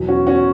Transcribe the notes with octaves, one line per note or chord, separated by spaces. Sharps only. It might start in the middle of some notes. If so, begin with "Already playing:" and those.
Already playing: E2 B2 F#3
C#4 F#4
C#4 F#4